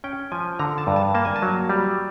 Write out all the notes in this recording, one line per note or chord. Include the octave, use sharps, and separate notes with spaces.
C#4 G5
F3 G#5
D3 A#5
A5
G2
A5
A#3 A5
G#5
A5
F#3
G3